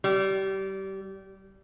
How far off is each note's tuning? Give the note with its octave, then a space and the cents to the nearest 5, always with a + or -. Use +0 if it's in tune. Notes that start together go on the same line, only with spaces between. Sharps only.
G3 -25